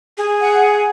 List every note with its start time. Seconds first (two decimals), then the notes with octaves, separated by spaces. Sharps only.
0.18 G#4
0.40 F#5